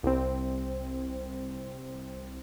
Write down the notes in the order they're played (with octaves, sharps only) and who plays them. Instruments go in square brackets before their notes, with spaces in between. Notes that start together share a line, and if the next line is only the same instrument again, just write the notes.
[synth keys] C2 C4